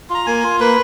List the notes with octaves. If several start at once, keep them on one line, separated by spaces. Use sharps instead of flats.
F4 A#5
A#3 G#5
F4
A#3 B4